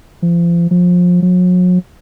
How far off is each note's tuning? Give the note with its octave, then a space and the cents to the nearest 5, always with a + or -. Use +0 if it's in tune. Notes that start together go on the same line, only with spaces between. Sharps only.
F3 -35
F3 +25
F#3 -40